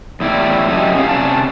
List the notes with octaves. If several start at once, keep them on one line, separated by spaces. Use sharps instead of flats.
E2 A2 E4 G4 D5
F#3 C#4 E4 G4 A4 D#5
C#4 G4 F5
C3 C#4 D5 A5